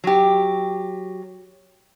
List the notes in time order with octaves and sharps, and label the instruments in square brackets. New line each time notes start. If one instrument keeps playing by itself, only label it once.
[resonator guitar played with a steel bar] F#3 G4